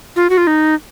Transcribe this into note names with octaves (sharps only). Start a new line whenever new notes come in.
F4
F#4
F4
D#4